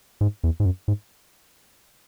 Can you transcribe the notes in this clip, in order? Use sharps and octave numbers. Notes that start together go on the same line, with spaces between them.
G#2
E2
G#2
F#2
G#2